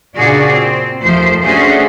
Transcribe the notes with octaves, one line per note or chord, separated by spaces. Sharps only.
A#2 C#3 D4 F#4 G#4 D5
C4
D#2 F3 A3 C5
A3 C#4 D4 F#4 G#4 C5